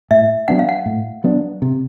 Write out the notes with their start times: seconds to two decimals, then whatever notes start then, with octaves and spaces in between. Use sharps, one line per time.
0.11 A2 E5
0.48 F#3 B3 D4 F#5
0.59 F5
0.69 F#5
0.86 A2
1.24 F#3 B3 D4
1.62 C3